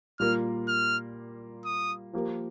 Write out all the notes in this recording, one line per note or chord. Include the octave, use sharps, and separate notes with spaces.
A#2 G3 A#3 F4 A#4 F6
F6
D#6
F3 A#3 G4 A#4